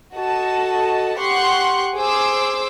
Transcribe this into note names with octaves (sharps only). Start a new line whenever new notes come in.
F#4 A4 D#5 A5
G4 F#5 C6 C#6 F#6
G#4 C5 C6 D6 E6